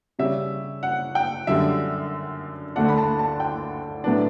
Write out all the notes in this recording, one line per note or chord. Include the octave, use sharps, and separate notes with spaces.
C#3 G3 C#4 E5
F#5
G5
F#2 D3 G3 E5
D2 D3 A3 D4 F#5
B5
A5
A5
G5
A2 F#3 B3 D4